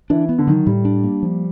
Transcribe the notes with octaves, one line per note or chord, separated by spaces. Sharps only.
E3 D4
B3
D3
D#3 F#3
A2 G3
D4
A#3
F3